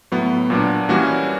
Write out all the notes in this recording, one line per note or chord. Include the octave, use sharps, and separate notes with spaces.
A2 F#3 B3
A#2 F#3 A#3 D4
E3 G3 A#3 C#4 F#4